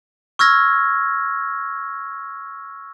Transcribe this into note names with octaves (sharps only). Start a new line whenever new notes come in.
C#6 E6 F6 G#6 A#6